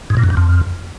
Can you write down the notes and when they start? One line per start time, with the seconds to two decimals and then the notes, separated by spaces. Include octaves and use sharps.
0.10 G#2
0.17 A#2
0.24 F#2
0.30 G2
0.37 F2